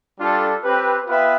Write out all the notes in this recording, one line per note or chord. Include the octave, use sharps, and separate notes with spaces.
G3 D4 F4 A4
C4 G4 B4
B3 F4 B4 E5 G5